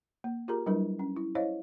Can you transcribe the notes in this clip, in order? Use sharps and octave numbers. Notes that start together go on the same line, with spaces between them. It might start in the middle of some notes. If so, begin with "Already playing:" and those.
A#3
F4 G4 G#4 A#4 A#5
F#3 G3 D4 E4 A#4 B4
C#4
E4
E4 C5 C#5 D#5 F5